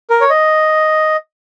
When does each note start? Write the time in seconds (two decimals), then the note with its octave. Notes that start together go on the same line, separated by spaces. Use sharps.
0.10 A#4
0.21 C#5
0.30 D#5